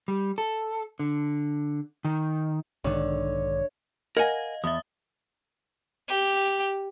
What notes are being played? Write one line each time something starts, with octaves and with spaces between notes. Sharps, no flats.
G3
A4
D3
D#3
B1 G#2 D3 D#3 C#5
A#4 D#5 F5 F#5 G#5
E2 E5 D#6
G4